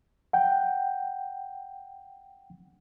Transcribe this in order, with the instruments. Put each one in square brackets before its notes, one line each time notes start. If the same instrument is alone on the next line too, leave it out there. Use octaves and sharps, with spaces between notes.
[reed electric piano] F#5 G5